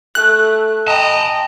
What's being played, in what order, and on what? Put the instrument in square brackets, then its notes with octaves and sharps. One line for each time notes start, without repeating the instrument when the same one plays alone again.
[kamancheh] A3 [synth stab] F#6
[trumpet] D#5 [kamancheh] G5 [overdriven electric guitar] A5 A#5